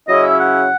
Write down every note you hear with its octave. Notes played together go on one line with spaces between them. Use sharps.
C#3 F#3 C#4 E4 D#5
E5
F#5